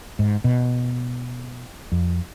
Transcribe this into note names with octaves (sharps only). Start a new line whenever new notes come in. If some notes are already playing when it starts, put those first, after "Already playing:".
G#2
B2
F2